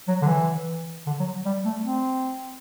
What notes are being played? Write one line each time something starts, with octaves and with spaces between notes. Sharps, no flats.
F#3
D3
E3
D3
F#3
G3
A3
C4